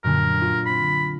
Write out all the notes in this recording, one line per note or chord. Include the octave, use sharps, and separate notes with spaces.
F#2 A#2 D3 A#4
F4
C4 B5 C7